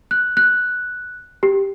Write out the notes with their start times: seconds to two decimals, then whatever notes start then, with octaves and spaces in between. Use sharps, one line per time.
0.11 F#6
0.37 F#6
1.43 G4